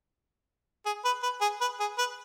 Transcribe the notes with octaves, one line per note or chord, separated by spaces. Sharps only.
G#4
B4
B4
G#4
B4
G#4
B4